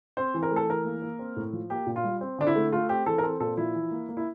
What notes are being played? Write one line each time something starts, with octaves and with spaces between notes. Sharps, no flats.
C4 C5
E3
A#4
A3
A4
E3 A#4
A#3
A#3
C4
A2
F3
A#3 G4
A#2
F4
G3
C4
D3 D4
E4
A3
A3 F4
C4 G4
E3 A4
A#4
C4 A4
A#2 A4
F3 E4
E3
A#3
A#3
E4